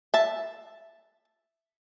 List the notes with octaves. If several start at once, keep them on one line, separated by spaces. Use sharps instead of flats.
E5 A5